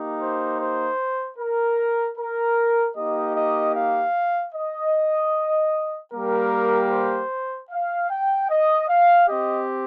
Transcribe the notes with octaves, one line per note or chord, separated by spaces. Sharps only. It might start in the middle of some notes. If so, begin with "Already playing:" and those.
Already playing: A#3 D#4 G4
C5
C5
A#4
A#4
A#3 D#4 G4 D#5
D#5
F5
D#5
G3 A#3 G4 A#4
C5
F5
G5
D#5
F5
C4 G4 D#5